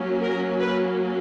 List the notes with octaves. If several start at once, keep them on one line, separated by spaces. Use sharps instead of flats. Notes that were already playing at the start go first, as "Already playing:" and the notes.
Already playing: F#3 A#3 C#4
A#4
B4